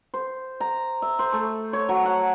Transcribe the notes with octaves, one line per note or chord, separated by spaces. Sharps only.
C5
A#5
E5
C5
A3
C#5
F#3
F#5